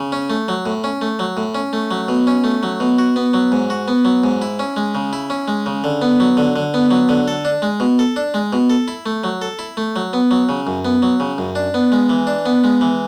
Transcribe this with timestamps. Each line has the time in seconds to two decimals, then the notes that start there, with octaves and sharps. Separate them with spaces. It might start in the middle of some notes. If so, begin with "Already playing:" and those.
Already playing: C#3
0.12 C#4
0.30 A3
0.48 F#3
0.66 A2
0.84 C#4
1.01 A3
1.19 F#3
1.37 A2
1.55 C#4
1.73 A3
1.91 F#3
2.08 B2
2.27 C#4
2.44 A3
2.63 F#3
2.80 B2
2.98 F#4
3.16 B3
3.33 F#3
3.52 G#2
3.70 F#4
3.88 B3
4.05 F#3
4.24 G#2
4.42 E4
4.59 C#4
4.77 G#3
4.95 C#3
5.13 E4
5.30 C#4
5.48 G#3
5.66 C#3
5.84 D3
6.02 B3
6.20 F#3
6.37 D3
6.56 D3
6.74 B3
6.91 F#3
7.09 D3
7.28 A4
7.45 D4
7.62 G#3
7.80 B2
7.99 A4
8.16 D4
8.34 G#3
8.53 B2
8.70 A4
8.88 E4
9.06 A3
9.24 F#3
9.42 A4
9.59 E4
9.77 A3
9.96 F#3
10.13 B3
10.31 F#3
10.49 C#3
10.67 F#2
10.85 B3
11.02 F#3
11.20 C#3
11.38 F#2
11.55 D4
11.74 B3
11.92 G#3
12.09 E3
12.27 D4
12.46 B3
12.64 G#3
12.81 E3